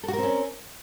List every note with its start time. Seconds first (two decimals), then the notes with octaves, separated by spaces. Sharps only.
0.03 A4
0.08 F#4
0.13 A#4
0.18 C4
0.23 C#4